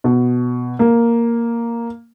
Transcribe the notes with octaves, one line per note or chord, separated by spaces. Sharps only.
B2
A#3